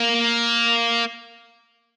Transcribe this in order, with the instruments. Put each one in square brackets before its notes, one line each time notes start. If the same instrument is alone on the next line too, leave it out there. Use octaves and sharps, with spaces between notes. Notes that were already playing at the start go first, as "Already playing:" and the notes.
Already playing: [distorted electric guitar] A#3